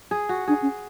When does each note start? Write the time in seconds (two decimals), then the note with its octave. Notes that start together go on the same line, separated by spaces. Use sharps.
0.11 G#4
0.29 F#4
0.48 D4 G#4
0.62 C#4